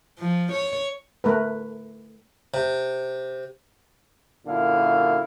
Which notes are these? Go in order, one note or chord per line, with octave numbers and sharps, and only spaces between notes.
F3
C#5
A3 A#4 B4
C3
F#2 A#2 D3 E4 F5